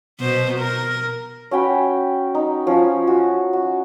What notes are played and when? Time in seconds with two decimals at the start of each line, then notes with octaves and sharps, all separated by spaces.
0.20 B2 C5
0.58 A#4
1.51 C#4 F#4 G5 B5
2.35 D#4
2.67 F3 C#4
3.07 F#4
3.53 F#4